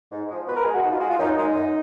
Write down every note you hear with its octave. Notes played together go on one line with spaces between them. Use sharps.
G#2
F3 G#3
B2 B4
A#4
G#3 G#4
F#4
B2 D#4
F4
G#3 F#4
F4
F#2 D#4
D#3 G#3 D#4
F#2